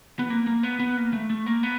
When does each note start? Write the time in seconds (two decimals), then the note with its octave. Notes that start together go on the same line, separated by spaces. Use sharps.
0.19 B3
0.30 A#3
0.47 A#3
0.63 B3
0.80 B3
0.97 A#3
1.13 A3
1.30 A3
1.46 A#3
1.63 B3